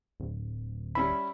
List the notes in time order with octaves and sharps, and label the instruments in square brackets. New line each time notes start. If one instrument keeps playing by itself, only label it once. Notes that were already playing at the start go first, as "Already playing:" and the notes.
[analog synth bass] D1
[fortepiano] G3 C#4 E4 [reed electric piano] B5